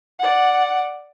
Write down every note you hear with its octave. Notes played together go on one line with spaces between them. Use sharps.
D5 F#5